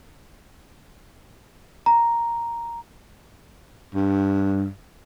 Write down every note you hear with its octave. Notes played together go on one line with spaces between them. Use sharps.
A#5
G2